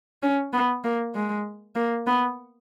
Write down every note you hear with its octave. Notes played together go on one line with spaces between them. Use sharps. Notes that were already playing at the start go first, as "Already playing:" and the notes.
C#4
B3
A#3
G#3
A#3
B3